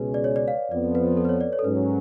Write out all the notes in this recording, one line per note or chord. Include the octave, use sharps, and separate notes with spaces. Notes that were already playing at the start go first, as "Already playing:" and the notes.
Already playing: C#2 B2 G#3 C#4 G#4 B4
D5
C#5
D5
F5
F2 F3 B3 D5
B4
A4
B4
C#5
D5
C#5
A4
G#2 F#3 C#4 B4